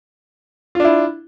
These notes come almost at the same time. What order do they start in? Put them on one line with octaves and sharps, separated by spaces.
F4 D4 E4